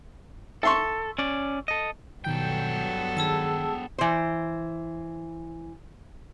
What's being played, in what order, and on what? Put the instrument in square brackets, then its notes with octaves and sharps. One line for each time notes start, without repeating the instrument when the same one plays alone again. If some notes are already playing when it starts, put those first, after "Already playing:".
[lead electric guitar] A4 [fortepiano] E5 C6 C#6
[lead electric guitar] C#4 D5
A4 D#5
[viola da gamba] G2 F#3 A4 [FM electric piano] B2 D#3 G6 [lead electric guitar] B3 G5
[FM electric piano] D#3 [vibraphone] G#4 A5 E6
[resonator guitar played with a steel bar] E3 C5